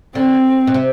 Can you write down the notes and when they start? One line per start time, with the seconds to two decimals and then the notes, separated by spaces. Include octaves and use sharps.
0.15 D3 C4
0.67 B2
0.74 C3